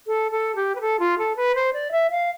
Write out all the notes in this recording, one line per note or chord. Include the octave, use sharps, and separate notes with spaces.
A4
A4
G4
B4
A4
F4
A4
B4
C5
D5
E5
F5